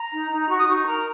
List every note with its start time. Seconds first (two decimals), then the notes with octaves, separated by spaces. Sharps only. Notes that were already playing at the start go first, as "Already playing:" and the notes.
Already playing: A#5
0.12 D#4
0.31 D#4
0.49 F#4 C#6
0.59 D#6
0.68 D#4 C#6
0.86 A#4 A#5